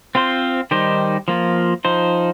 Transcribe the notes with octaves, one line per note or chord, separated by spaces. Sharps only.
C4 F4 C5
D#3 G3 D#4 G4 C5
F3 A#3 F4
F3 D#4 C5